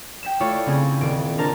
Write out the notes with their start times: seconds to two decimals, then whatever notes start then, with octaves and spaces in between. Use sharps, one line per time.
0.23 G5 B6 E7
0.40 A3 E4 F4 A4 C#5 D5
0.66 C#3 C4 G#4
1.01 D#1 D7
1.38 D4 A#4 C5 A5